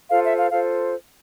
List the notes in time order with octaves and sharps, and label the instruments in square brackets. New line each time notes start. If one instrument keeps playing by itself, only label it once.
[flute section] F4 A4 C5 F5
E5
F5
F4 A4 C5 F5